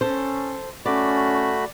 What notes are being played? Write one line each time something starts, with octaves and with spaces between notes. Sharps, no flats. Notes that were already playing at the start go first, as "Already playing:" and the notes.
C#4 A4 C5
A3 C#4 F#4 D5 B5